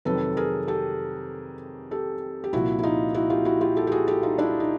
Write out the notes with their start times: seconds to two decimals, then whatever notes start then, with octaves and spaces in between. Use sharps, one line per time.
0.05 F2 C3 D#3 F#3 A4 B4
0.37 G#4 A#4
0.68 G4 A4
1.91 G4 A4
2.44 G4
2.53 C2 A#2 F3 E4 F#4
2.79 E4
2.83 D#4 F4
3.14 E4 F#4
3.30 F4 G4
3.45 E4 F#4
3.61 F4 G4
3.77 G4 A4
3.87 G4
3.92 F#4 G#4
4.07 G4 A4
4.23 D#4 F4
4.38 D4 E4
4.60 D#4